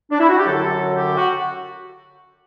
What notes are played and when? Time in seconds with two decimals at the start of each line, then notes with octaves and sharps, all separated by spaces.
0.11 D4
0.20 E4
0.29 F#4
0.38 G4
0.46 F#2 D3 F#3 A4
0.93 G4
1.16 F#4